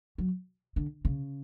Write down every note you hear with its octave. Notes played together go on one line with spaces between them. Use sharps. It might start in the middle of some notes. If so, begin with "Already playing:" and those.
F#3
D3
C#3